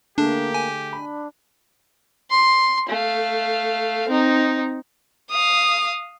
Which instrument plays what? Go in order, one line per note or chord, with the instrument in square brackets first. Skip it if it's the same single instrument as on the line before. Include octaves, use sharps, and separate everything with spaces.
[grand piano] D3 A3 G#4 [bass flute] A#3 [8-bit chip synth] D4 [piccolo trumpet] G4
[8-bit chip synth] G#5
[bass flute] D4 [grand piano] B5
[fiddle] C6
A3 F5
C4 D#4
[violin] F5 D#6